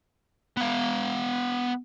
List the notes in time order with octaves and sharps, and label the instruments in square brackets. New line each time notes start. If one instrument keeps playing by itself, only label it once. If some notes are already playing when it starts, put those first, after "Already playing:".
[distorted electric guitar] B3 F5